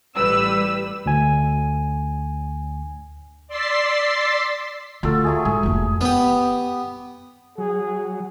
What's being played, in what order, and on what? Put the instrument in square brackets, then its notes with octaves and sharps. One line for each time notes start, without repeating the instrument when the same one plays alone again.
[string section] A1 G3 B4 E6
[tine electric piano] D2 G#5
[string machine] D5 C6 E6 A6 B6 C7
[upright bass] D2 [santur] F4 F#4 A4
[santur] F#3 A3 G#4
[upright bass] G#2 [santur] G#4
[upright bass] F1 A#3
[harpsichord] B3 G4
[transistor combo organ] F#3 [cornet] G#4